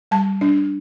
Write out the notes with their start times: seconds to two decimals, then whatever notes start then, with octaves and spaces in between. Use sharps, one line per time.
0.11 G3 A5
0.41 D4